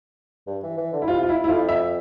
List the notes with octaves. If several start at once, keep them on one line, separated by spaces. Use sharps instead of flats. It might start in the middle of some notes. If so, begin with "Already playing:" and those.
G2
E3
E3
D3
E4
C3 F4
F4
E4
E4
F2 F4
E5